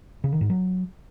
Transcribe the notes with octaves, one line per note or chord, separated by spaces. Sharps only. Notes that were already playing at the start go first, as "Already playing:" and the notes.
C#3
D#3
G#2
F#3